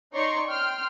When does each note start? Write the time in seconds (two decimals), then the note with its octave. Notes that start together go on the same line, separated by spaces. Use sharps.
0.14 D#4 C#5 D5 A#5 C6 C#6
0.48 G5 C6 F6